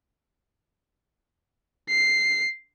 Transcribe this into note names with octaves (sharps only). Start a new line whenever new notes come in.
C7